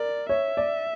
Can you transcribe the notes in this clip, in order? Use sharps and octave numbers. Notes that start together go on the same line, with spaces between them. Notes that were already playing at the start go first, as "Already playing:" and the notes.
Already playing: A#4 D5
C#5 E5
D5